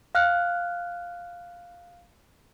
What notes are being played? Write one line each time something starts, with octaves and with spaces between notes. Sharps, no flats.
F5 F6 F#6